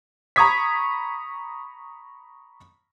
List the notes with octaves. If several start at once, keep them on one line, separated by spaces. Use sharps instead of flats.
A#5 B5 C#6 D#6 G#6 B6